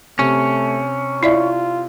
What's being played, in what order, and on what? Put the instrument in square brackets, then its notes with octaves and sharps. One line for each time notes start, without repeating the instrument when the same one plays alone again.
[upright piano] C3 [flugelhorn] A3 [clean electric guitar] C#4
[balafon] E4 D5 E5 [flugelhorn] F4